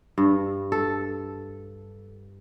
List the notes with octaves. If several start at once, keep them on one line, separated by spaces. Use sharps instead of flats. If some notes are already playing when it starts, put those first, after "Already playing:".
G2
A4